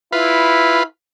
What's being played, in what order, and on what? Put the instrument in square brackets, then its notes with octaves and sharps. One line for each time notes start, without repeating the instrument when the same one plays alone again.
[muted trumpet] E4 [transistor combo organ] F4 B4